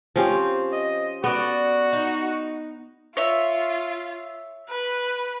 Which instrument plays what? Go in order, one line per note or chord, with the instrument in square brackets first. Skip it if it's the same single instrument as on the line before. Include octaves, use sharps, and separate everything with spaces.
[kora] F3 C#4 G4 [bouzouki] C4
[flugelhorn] D#5
[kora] B3 [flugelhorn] F#4 [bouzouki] A4 D5
[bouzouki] D#4
[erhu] F4 [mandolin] C#5 E5
[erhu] B4